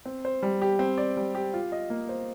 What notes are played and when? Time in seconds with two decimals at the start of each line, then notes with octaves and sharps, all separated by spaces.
0.05 C4
0.25 C5
0.43 G3
0.62 G4
0.79 C4
0.98 D5
1.17 G3
1.35 G4
1.54 F4
1.72 D#5
1.90 A#3
2.09 C5